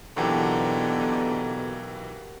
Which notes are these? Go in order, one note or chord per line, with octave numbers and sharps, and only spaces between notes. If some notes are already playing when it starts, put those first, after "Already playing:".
B1 B2 D3 E3 A#3 F#4 G4 A5